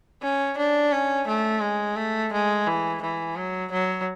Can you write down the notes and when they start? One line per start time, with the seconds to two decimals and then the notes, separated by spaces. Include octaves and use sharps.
0.22 C#4
0.57 D4
0.92 C#4
1.27 A3
1.62 G#3
1.96 A3
2.32 G#3
2.67 E3
3.02 E3
3.35 F#3
3.72 F#3